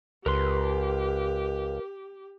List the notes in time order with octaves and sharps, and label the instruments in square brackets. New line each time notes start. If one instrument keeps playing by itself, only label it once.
[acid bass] C#2 [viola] G4 [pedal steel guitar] A#4 B4 C6